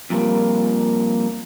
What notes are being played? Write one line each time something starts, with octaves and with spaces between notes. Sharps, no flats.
F2 A#2 G3 G#3 A#3